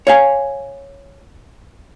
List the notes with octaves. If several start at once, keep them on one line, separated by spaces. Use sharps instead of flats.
C#5 F5 G#5